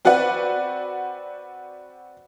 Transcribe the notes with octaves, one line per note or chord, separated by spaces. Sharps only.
C4 F#4 B4 D5 F#5